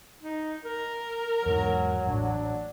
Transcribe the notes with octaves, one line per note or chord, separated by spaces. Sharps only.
D#4
A#4
E2 G#2 F#3
A1 D4